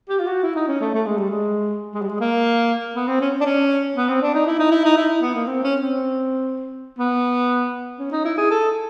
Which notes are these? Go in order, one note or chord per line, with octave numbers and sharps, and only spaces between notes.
G4
F4
F#4
E4
D#4
C#4
A3
A3
G#3
G3
G#3
G#3
G3
G#3
A#3
B3
C4
C#4
D4
C#4
B3
C4
D4
D#4
E4
D#4
E4
D#4
E4
B3
A#3
C4
C#4
C4
B3
C#4
D#4
E4
G#4
A4